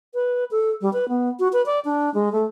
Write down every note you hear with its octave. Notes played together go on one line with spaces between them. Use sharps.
B4
A4
G3
B4
B3
F#4
B4
D5
D4
G#3
A3